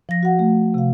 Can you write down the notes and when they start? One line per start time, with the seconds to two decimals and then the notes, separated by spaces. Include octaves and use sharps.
0.09 F3 A#6
0.23 F#4 F#5
0.39 A3
0.74 C3 F5